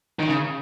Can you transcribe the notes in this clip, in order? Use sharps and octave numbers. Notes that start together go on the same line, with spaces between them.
D#3
C#3